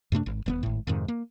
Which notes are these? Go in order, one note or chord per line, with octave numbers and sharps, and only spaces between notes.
F#2 C3 A3 D4
G#1
D#1 A3 B3
G#1 A2
F2 G#2 C3 D#3
A#3